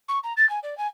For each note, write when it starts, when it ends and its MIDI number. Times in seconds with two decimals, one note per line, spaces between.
0.08 0.18 85
0.23 0.33 82
0.36 0.47 93
0.49 0.59 80
0.63 0.76 74
0.77 0.86 80